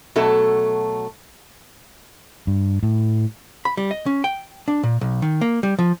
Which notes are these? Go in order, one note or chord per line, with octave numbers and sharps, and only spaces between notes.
B2 F#3 A3 A4
G2
A2
B5
G3
D#5
C#4
G5
D4
A#2
B1
D#3
A#3
G3
F3